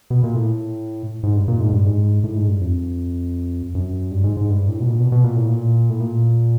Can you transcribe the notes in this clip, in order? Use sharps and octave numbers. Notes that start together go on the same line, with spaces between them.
B2
A#2
A2
G#2
G2
A#2
G#2
G2
G#2
A2
G#2
G2
F2
F#2
G2
G#2
G#2
G2
A2
B2
A#2
B2
B2
A#2
A2
A#2
A2
A#2